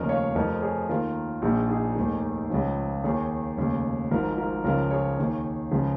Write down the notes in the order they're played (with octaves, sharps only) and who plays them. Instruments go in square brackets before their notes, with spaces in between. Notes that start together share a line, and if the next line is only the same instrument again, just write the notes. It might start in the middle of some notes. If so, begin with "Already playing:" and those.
Already playing: [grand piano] F1 D#2 C#3 F3 A#4 D#5
C#5 F5
F1 F2 F3 A#4 D#5
G#4 C#5
D#2 D#3 F4 A#4
A#1 A#2 F3 D#4 G#4
D#4 G#4
F1 D#2 D#3
C#2 C#3 F3
D#2 D#3 G#4 C#5
F1 D#2 C#3
G#1 G#2 F3 F4 A#4
F4 A#4
C#2 C#3 F3 F4 A#4
G#4 C#5
D#2 D#3
C#2 C#3 F3